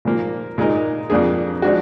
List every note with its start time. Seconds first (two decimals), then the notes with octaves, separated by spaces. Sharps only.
0.05 A#2 F3 A#3
0.58 A#2 G#3 D#4 A#4
1.10 F2 F3 A#3 D4 G#4
1.62 F3 G#3 D4 F#4